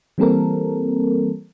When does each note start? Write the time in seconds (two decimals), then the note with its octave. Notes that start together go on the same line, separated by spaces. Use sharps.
0.18 E3 G3 A#3 C4 A4 A#4